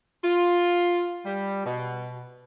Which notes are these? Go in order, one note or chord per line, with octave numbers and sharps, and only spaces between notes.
F4
G3
B2